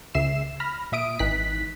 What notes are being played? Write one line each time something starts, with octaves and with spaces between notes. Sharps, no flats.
C#2 C#3 E5 C7 E7
B5 F6 A#6
A#2 E5 D#6 D7
G#1 E3 D#4 F#6 B6